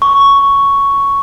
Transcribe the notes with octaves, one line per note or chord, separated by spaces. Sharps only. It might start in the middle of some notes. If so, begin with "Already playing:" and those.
C#6